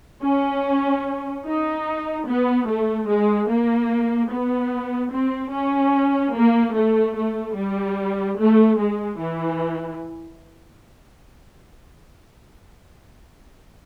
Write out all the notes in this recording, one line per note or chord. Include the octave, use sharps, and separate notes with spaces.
C#4
D#4
B3
A3
G#3
A#3
B3
C4
C#4
A#3
A3
A3
G3
A3
G#3
E3